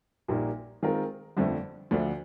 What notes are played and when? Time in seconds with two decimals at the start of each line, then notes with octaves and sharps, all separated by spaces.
0.28 A#1 A#2 G3 A#3 D#4
0.83 D#3 G#3 C4 F4 A#4
1.37 G1 F2 D3 F3 A3
1.91 D2 D3 F3 A3 D4